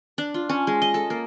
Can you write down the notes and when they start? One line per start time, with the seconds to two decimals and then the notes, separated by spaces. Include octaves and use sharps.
0.18 D4
0.34 F4
0.49 C#4
0.67 G#3
0.82 D#5
0.94 A4
1.10 A#3